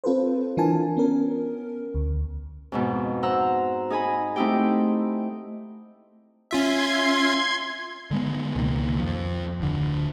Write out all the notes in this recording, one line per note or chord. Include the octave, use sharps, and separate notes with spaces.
C4 F4 A4 B4 C5
E3 D4 F4 A#4 G#5 A5
B3 C#4 A#4
D2
F2 G#2 B2
C5 F#5 A#5 E6
D#4 G#4 D#5 G#5 B5
A3 C4 D#4 E4 G4 G5
C#4 F4 E5 C6 G#6
D3 G#3 B3
C#2 B2 D#3 A#3
F2 F3
D1 D3